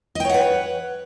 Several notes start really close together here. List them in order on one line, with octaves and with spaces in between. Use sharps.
D#5 G5 C#5 F#5 B4